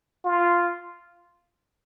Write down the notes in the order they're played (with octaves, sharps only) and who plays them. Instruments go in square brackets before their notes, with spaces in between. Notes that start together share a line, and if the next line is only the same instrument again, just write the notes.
[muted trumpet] F4